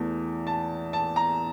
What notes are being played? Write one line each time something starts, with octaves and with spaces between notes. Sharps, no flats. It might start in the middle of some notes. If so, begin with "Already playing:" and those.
Already playing: E2 E3 A3
A5
A5
A#5